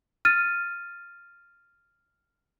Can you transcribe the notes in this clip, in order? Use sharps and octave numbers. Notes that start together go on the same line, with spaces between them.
F6 A6 D#7